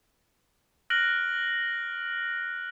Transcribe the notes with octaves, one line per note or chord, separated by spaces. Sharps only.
F6 F#6 A#6 D7 F#7